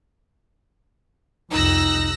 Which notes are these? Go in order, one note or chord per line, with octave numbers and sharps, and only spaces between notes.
C2 F2 D#4 E6 F#6 A#6